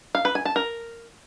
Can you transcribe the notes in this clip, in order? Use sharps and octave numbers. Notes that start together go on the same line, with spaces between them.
F5
B4
G#5
A5
A#4